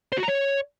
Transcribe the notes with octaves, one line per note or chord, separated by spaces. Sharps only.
C5
F#4
A#5
C#5